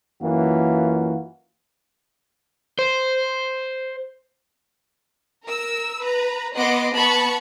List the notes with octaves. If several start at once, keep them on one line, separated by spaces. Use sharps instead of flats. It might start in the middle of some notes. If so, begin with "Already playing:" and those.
F#2 E3 A#3 F4 F#4
C5
A#4 E6
B4 A#5
B3 D#5 F#5 C6 D6
B3 A5 B5 C#6